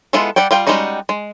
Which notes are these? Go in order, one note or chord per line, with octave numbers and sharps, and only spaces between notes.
G#3 B3 E4 F4 A4
G3 D5 F#5 G5
G3 F4 G5
G3 G#3 C#4 D#4 F#4
G#3